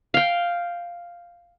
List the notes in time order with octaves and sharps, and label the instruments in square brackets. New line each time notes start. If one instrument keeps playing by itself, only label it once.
[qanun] F5 G5